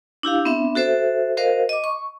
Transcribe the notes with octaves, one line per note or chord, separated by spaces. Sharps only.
D4 E4 G4 F5
B3 C4 D4 E5
F#4 A4 C5 E5
F#4 A#4 C5 D#5 F5
D#5 D6
C#6